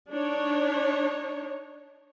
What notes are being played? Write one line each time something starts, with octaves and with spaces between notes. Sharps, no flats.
D4 D#4 C#5